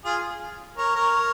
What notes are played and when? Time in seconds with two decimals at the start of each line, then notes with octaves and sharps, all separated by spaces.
0.05 F4 G#4
0.77 A#4 C#5
0.96 A#4 C#5